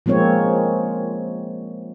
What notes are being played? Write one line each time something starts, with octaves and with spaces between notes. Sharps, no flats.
F3 G#3 A#3 C4 C#5